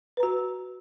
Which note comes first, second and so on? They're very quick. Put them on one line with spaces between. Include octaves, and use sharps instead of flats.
B4 A#5 F#4